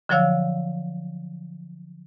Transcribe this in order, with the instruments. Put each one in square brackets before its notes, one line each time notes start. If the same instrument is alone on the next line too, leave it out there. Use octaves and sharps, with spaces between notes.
[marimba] D3 F3 F#3 C#5 F5 E6